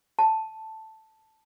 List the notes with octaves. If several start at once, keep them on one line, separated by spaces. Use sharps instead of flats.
A5